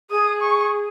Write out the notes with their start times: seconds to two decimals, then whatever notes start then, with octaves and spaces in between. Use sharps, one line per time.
0.10 G#4 D#6
0.41 C#6